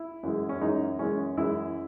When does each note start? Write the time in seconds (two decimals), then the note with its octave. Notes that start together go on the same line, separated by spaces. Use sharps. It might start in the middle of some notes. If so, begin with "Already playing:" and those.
Already playing: E4
0.23 F#2 E3 G#3
0.49 C#4
0.61 F#2 E3 G#3 D#4
0.99 F#2 E3 G#3 C#4
1.37 F#2 E3 G#3 E4